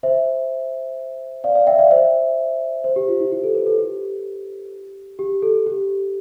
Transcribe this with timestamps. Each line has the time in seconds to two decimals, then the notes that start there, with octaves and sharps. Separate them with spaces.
0.03 C5 E5
1.44 D5 F5
1.55 D5 F5
1.67 E5 G5
1.79 D5 F5
1.91 C5 E5
2.84 C5
2.96 G4
3.08 F4
3.20 E4
3.32 G4
3.44 A4
3.55 B4
3.66 A4
3.78 G4
5.19 G4
5.42 A4
5.66 G4